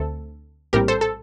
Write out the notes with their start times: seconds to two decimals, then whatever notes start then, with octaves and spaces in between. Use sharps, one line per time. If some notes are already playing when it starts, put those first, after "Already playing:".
Already playing: D2 D3 A3 C4 A4
0.73 A#1 A2 G3 C4 G4 A#4
0.88 A4 C5
1.01 A4